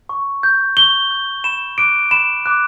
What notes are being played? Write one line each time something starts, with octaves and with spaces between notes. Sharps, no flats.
C#6
G6
C#6 G7
G6
B5 E7
D6 F#6 D7
B5 E7
D6 F#6